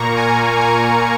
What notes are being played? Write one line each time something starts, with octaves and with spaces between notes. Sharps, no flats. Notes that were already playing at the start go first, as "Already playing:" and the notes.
Already playing: A#2 A#3 A#5 C#6
G#5
G#5